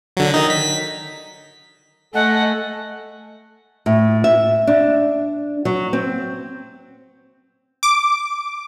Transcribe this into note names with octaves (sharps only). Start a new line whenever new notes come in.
D3 F#3
D#3 D#4
B6
A3 A4 D#5 F#5 G#5
A2
E5
D4
F#3
C4
D6